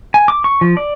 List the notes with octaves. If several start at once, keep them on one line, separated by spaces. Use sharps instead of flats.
G#5
D6
C#6
F3
D5